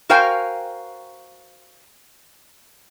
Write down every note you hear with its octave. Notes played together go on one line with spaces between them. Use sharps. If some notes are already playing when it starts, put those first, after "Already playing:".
F#4 A#4 C5 F5 G5 G#5